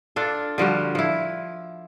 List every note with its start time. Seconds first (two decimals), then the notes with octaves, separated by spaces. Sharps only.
0.16 D4 F4 A4
0.58 D3 F3 G3 F#4
0.95 F3 E4